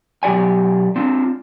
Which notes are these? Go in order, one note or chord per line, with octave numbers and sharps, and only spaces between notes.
B2 F#3 G4 D5 G#5
C4 D4 F4